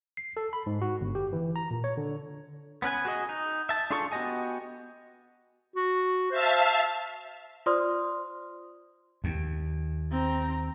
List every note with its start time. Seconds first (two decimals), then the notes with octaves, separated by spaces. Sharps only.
0.17 C7
0.37 A4
0.53 B5
0.66 G#2
0.82 F#4
1.01 G1
1.15 G4
1.33 E3
1.56 A#5
1.71 A#2
1.84 C#5
1.97 D3
2.82 B3 C#4 B4 G#5
3.05 F#4 G#4 D#5
3.29 D#4
3.69 E5 A5
3.90 D4 F4 G#4 A4 C#6
4.12 B3 F#4 G4 D#5 G#5
5.76 F#4
6.31 C5 E5 F5 A5
7.66 F4 C5 D5 C6 D#6 F6
9.24 D#2
10.11 C4 A#5